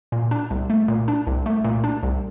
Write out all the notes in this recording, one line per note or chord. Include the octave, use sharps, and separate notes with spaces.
A#2
D4
C2
A3
A#2
D4
C2
A3
A#2
D4
C2